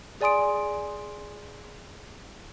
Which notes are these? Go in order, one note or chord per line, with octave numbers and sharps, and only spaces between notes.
G#4 D5 G#5 C6 D#6 D7